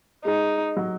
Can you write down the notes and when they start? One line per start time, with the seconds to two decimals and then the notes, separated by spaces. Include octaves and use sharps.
0.25 G#3 D#4
0.77 F#3